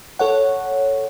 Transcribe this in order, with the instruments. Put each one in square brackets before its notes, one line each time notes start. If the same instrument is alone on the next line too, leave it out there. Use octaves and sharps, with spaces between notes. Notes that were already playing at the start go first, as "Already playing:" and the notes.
[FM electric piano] A4 C#5 F#5